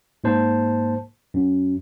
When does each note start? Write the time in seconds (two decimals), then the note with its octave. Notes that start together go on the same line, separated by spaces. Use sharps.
0.24 G#2 A#3 C5 A5
1.34 F#2